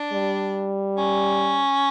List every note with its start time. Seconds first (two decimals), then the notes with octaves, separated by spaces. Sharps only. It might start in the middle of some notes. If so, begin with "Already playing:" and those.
Already playing: D4
0.13 G3
0.97 C#4